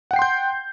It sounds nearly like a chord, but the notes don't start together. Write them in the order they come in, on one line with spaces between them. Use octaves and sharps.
F#5 G5 C7 C6 G6